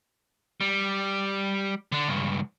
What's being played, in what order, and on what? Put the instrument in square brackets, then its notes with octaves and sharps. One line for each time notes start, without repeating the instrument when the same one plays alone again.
[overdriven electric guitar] G3
D3 D4
C#2 G2